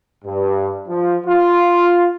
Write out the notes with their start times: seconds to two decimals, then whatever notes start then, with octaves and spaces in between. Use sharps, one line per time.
0.25 G2
0.88 F3
1.25 F4